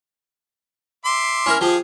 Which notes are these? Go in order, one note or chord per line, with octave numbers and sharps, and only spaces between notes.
E5 C6 D6
C#4 E4 A#4
F3 G4 G#4